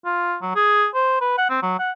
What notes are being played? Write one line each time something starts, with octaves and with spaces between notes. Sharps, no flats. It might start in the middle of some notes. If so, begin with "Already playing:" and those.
F4
F#3
G#4
C5
B4
F#5
C4
F#3
F#5